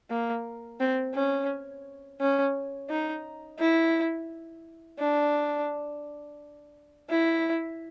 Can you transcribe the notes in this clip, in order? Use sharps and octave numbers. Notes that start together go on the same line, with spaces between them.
A#3
C4
C#4
C#4
D#4
E4
D4
E4